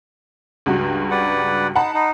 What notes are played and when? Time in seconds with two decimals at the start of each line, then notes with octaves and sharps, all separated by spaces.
0.66 C#2 G2 F#4
1.11 B4 D5 F#5
1.76 D#4 F#5 A5 B5
1.94 D#4